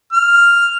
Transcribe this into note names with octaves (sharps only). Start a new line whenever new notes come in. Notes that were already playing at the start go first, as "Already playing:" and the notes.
F6